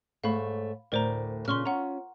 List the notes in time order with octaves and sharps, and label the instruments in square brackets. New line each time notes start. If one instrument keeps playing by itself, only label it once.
[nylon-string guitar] G#2 A3 C#5 [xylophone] F5 B5
[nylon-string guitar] D2 A2 D5 [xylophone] A#4 C5 A#5
[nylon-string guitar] A#2 C#3 C#4 [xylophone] C6 C#6 F6
[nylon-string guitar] C#4 F4 [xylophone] F#5 A#5